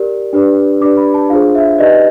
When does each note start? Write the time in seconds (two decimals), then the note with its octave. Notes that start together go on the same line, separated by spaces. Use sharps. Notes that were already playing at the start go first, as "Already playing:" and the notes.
Already playing: G4 A#4 D5
0.33 D4 G4 B4 D5
0.81 D4 G4 B4 D5 D6
0.97 B5
1.14 A5
1.30 D4 F4 G#4 C5 F5
1.55 E5
1.79 D#4 G4 B4 D5 D#5